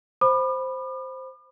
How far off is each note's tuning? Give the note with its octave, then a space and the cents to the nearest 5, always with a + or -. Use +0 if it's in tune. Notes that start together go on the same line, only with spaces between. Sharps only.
C5 +0 B5 +0 D6 +45